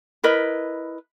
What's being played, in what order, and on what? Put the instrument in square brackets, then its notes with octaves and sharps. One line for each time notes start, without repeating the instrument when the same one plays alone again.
[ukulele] E4 A#4 B4 D#5